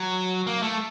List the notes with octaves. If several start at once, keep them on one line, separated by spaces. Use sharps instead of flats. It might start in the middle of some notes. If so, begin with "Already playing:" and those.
Already playing: F#3
A#3
A3